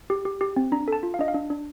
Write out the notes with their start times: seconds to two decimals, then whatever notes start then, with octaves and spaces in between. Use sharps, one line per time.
0.10 G4
0.25 G4
0.41 G4
0.56 C4
0.72 D4 A#5
0.88 A4 A5
1.03 F4
1.14 F5
1.19 D4 D#5
1.28 F5
1.34 D4
1.50 D4